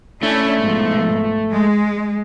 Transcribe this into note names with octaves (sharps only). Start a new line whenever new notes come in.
A3 C#4 D4 E4
G#2 B2 F3
G#3